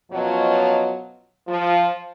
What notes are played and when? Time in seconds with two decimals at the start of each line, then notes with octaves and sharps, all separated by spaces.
0.11 F#2 B2 F3 F#3 C#5 D#5
1.48 F3 F4